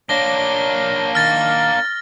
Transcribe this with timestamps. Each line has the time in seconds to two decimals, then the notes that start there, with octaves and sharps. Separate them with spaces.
0.09 A#3 D4 C#5 A#6 G7
1.15 D#3 F6 A6 A#6